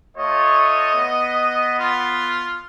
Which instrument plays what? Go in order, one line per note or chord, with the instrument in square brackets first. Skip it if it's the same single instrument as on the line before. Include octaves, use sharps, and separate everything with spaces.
[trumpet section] A3 F4 C#5 [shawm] D#5
[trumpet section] B3
[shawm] F4